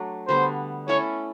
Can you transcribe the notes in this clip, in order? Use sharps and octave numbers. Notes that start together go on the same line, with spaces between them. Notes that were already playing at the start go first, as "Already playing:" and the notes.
Already playing: F#3 A3 D4
D3 G3 B3 C5
A3 C#4 E4 A4 C#5